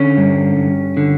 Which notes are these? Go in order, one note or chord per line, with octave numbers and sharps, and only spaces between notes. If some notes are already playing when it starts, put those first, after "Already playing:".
Already playing: D3 C#4
G2
G2
D3